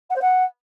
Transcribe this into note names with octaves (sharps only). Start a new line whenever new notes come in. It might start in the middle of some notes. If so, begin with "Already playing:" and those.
F#5
C5
F#5